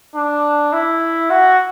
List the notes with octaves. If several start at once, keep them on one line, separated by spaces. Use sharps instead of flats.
D4
E4
F#4